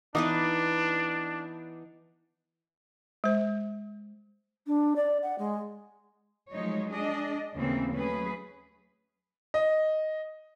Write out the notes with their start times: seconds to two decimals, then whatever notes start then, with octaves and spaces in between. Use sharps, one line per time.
0.15 E3 B3 D4 D#4 B4 D6 D#6
3.24 G#3 C5
4.67 D4
4.96 D5
5.22 F#5
5.38 G#3
6.52 F3 F#3 G#3 A3 D#4 C#5
6.90 D4 G#4 D#5
7.57 D#2 A2 C#3 E3 A#3 C4
7.96 F#3 A3 C#4 G#4 B4
9.54 D#5